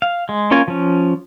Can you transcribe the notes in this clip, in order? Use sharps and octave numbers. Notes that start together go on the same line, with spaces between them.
F5
G#3
A#3 C#4 F4 A#4 G#5
F3 C#4